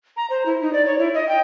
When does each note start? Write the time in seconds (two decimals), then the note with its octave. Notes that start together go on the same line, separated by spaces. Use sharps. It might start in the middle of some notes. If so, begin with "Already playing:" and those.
0.17 A#5
0.30 C5
0.46 E4
0.62 D#4
0.73 D5
0.86 C#5
0.99 E4
1.14 D#5
1.29 G5